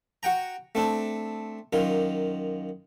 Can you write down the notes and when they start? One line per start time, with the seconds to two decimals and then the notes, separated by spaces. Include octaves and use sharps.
0.23 F#4 F#5 G5 A#5
0.75 A3 C4 D4
1.73 F#2 D#3 F4